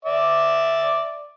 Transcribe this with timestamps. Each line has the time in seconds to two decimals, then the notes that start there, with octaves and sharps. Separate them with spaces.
0.05 D5 E5 D6